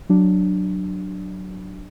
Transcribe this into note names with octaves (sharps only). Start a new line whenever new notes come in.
F#3 D4